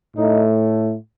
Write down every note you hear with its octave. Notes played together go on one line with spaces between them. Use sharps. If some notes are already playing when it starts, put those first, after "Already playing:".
A2 A3 D#4